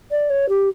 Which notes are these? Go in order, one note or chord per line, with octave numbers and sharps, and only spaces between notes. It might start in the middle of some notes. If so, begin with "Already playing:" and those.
D5
C#5
G4